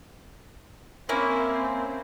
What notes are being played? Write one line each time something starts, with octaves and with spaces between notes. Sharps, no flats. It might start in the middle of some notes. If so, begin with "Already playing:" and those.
A#3 C4 C#4 E4